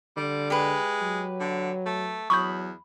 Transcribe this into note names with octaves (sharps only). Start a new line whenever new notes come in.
D3 G3
G#3 G4 B4
F#3
D3
A3
E2 F#3 B5 C#6 D#6 G6